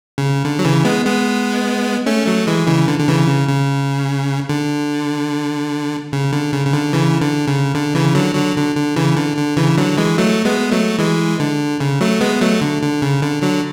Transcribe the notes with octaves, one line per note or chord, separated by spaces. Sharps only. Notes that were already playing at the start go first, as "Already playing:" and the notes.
C#3
D3
F#3
C#3 E3
G#3 B3
G#3 B3
A3 C#4
F#3 A3
E3 G#3
C#3 E3
D3
D3
C#3 E3
C#3
C#3
D3
C#3
D3
C#3
C#3
D3
C#3 E3
D3
C#3
D3
C#3 E3
D3 F#3
D3 F#3
D3
D3
C#3 E3
D3
D3
C#3 E3
D3 F#3
E3 G#3
F#3 A3
G#3 B3
F#3 A3
E3 G#3
D3
C#3
F#3 A3
G#3 B3
F#3 A3
D3
D3
C#3
D3
D3 F#3